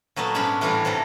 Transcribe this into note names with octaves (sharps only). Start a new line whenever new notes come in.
A#2 F#3 A3 B3
G#2 G#3 C#4 D4 B5
A2 E3 G3 D4 F4 A#5
G#2 C3 E3 A4 A#5